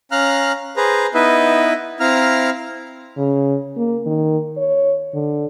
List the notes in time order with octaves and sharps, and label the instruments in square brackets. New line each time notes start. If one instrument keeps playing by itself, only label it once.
[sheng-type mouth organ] C#4 F5 A#5 F6 F#6
G#4 B4 C5 A#5
B3 D#4 E4 B4 D#5 E5
C4 E4 F5 A#5 F6
[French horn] C#3
A#3
D#3
C#5
D3